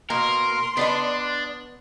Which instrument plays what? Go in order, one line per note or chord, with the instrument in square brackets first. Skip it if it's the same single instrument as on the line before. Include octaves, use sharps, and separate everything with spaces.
[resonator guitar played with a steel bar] B2 A#3 [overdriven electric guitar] A#4 [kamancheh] C6
[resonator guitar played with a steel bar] B3 D5 D#5 [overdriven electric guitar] D4